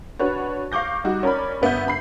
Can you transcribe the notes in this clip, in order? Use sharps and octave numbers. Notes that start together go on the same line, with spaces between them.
D4 F#4 B4 C#5
F5 C#6 D6 G6 A#6
G3 D#4 F#4
C#4 A#4 D5 B5
G1 B3 E5 B5 G6
G1 B5 C7